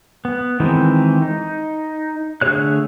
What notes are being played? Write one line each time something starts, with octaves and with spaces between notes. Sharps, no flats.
B3
D#3 E3 G#3 C4
D#4
D3 A3 G#4 C#5 F#6